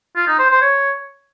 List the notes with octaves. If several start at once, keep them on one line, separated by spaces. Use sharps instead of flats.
F4
D#4
C5
C5
C#5